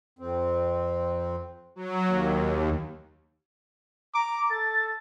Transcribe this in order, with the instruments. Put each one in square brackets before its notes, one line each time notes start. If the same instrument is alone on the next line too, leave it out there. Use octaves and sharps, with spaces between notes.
[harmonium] F2 C4
[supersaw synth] F#3
D#2
[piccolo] A#5 [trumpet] D6
[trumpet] A4 [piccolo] A6